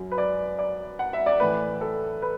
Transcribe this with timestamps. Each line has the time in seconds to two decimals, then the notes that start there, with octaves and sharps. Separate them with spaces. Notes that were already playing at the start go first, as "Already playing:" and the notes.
Already playing: F#2 F#3
0.12 B4
0.18 D5
0.59 D5
0.99 F#5
1.13 E5
1.26 D5
1.40 A2 E3 B4
1.81 A4
2.22 B4